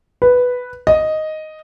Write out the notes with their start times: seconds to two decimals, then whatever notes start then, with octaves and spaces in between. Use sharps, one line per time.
0.22 B4
0.87 D#5